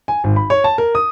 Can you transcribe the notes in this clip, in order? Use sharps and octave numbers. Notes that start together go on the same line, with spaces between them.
G#5
G#1
B5
C#5
A5
A#4
D#6